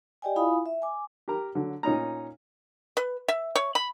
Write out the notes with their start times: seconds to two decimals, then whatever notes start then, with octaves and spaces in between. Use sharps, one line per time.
0.22 G4 D5 D#5 G5 G#5
0.36 E4 F4 F5 G#5 B5 D#6
0.66 E5
0.82 G#5 D6
1.28 G4 A#4 A#5
1.55 D3 F#3
1.83 A#2 C#4 D#4 A#5
2.97 B4
3.28 E5
3.55 C#5
3.75 B5